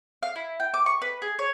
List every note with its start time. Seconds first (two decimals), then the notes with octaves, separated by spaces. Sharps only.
0.23 F5
0.36 E4
0.60 G5
0.74 D6
0.86 C#6
1.02 B4
1.22 G#4
1.39 C#5